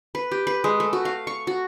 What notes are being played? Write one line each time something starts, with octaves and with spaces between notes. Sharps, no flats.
B4
G4
B4
G#3
A3
F#4
F5
C#6
F#4